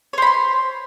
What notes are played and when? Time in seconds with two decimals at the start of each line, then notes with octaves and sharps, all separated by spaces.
0.13 C#5
0.18 C5
0.22 B5
0.27 C6